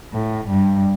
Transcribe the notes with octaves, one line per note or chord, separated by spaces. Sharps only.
A2
G2